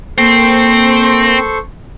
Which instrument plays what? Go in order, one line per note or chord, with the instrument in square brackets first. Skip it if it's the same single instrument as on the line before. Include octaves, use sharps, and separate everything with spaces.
[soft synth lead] A#3 [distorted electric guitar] C4 [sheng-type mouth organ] A4 C5 C#6